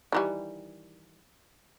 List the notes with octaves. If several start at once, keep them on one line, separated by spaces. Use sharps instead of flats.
D#3 E3 G3